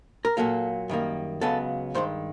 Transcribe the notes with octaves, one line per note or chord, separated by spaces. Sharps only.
A#4
A#2 F#3 A#3 A4
F#2 D#3 G3 A#3
C#2 C#3 F#3 B3 A4
G2 D#3 G#3 C5